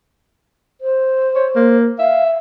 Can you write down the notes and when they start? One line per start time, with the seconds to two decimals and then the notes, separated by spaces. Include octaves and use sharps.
0.81 C5
1.36 C#5
1.55 A#3
1.99 E5 F5